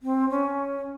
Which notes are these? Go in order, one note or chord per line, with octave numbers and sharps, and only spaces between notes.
C4
C#4